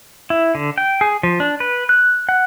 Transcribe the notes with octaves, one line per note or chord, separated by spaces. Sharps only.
E4
D3
G5
G#4
F3
D4
B4
F#6
F#5